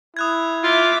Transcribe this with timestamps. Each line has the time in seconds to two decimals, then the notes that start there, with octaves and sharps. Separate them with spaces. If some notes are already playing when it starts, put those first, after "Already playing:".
0.17 E4 D#6 F#6 G#6
0.64 F4 E5 D6